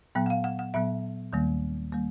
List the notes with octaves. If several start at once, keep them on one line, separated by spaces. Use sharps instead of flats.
A#2 F#3 B3 G5
F#5
F5
F#5
F#5
A#2 F#3 B3 E5
D#2 D#3 G3 A#3
D#3 G3 A#3